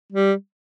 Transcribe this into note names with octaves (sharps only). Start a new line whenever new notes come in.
G3